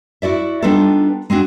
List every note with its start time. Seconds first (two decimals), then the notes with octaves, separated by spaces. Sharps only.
0.22 E4 F#4 D5 E5
0.62 G3 B3 D4 D#4 F4 A4
1.30 G#3 C4 D4 F#4